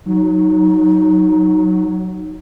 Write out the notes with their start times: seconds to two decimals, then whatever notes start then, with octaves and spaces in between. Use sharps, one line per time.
0.06 F#3 D#4